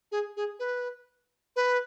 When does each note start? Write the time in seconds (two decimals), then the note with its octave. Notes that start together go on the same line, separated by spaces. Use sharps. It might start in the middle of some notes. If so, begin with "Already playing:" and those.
0.12 G#4
0.37 G#4
0.59 B4
1.56 B4